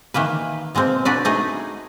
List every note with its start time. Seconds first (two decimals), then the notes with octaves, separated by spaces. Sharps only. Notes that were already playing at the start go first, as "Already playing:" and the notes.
0.14 D#3 E3 A#3 B4
0.75 B2 G#3 A#3 C4
1.05 D4 F#4 B4 D5
1.25 A3 D#4 G#4